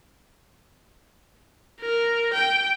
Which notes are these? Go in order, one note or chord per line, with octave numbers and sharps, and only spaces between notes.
A#4
G5